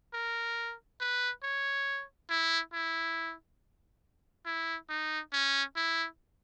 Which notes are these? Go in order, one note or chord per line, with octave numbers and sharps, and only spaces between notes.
A#4
B4
C#5
E4
E4
E4
D#4
C#4
E4